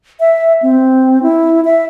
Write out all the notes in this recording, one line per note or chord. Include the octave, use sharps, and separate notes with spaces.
E5
C4
E4
E5